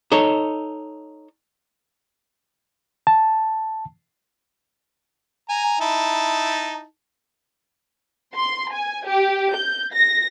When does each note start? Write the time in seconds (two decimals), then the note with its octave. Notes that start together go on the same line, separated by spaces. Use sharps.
0.12 D#4 A4 C#5
3.07 A5
5.49 G#5 A#5
5.81 D#4 E4 A5
8.36 C6
8.73 G#5
9.06 G4
9.54 G6
9.93 A#6